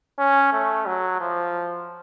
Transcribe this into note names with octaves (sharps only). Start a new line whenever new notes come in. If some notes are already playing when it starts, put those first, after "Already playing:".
C#4
A3
F#3
F3